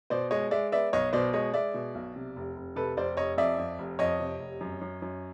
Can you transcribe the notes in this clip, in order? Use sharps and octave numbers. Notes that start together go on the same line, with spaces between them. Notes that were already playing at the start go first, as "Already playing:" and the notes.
B2 C5 D5
G#3 C#5 D#5
G#3 D5 E5
B3 D5 E5
B1 C#5 D#5
B2 C5 D5
G#3 C#5 D#5
G#3 D5 E5
B2
B1
C3
F1
F1
C3 A4 B4
F1 C5 D5
F1 C#5 D#5
F2 D5 E5
F2
F1
F2 C#5 D#5
C3
F1
F#2
F#2
F#2